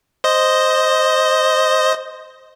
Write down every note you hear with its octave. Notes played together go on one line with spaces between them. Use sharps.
C5 D#5